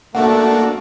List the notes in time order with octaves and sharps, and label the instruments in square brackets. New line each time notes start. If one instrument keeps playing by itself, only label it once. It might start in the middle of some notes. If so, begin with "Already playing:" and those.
[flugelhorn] A3 [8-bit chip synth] A#3 D4 F#4 [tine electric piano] F#5